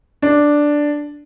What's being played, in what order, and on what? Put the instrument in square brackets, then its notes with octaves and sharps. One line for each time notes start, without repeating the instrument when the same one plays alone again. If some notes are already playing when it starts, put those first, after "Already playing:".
[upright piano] D4